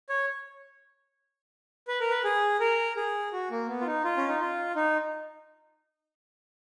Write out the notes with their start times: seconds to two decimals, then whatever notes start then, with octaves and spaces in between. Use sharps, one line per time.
0.09 C#5
1.88 B4
2.00 A#4
2.10 B4
2.24 G#4
2.60 A#4
2.96 G#4
3.32 F#4
3.51 A#3
3.68 B3
3.81 F4
3.86 D#4
4.04 F4
4.17 C#4
4.28 D#4
4.40 F4
4.76 D#4